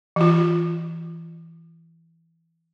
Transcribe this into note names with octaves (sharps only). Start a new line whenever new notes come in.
E3 F4